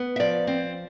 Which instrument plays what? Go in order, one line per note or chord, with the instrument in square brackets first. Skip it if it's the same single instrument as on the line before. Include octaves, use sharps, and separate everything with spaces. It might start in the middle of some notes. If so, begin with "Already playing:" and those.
Already playing: [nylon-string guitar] B3
E5
F3 D5
C4